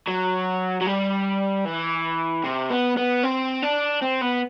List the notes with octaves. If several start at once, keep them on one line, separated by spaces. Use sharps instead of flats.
F#3
F#3
G3
E3
C3
B3
B3
C4
D4
C4
B3